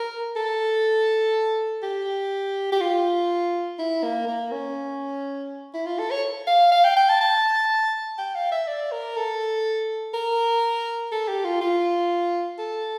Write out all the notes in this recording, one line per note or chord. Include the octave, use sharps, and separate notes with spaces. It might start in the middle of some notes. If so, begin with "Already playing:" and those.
Already playing: A#4
A4
G4
G4
F4
E4
A#3
A#3
C#4
E4
F4
A4
C#5
F5
F5
G5
G5
A5
A5
G5
F5
E5
D5
A#4
A4
A#4
A4
G4
F4
F4
A4